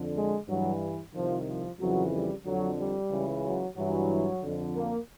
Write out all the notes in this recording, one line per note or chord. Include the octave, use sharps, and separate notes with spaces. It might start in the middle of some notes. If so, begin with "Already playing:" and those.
Already playing: F2 D3
G#3
G2 E3 F#3
C2 C3 D#3 F3
F3
F2 C#3 E3 F#3
G3
F2 D3 F#3
G3
C#2 C#3 E3
F#3
G2 E3 F#3
F2 D3
A#3